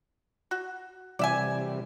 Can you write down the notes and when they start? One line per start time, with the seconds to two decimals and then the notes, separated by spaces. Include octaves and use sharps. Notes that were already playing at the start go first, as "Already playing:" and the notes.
0.51 F#4
1.19 C3 E3 G3 D5 E5 G#5